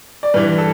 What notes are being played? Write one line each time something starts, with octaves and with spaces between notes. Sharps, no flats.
D5
G2 E3 B4
A4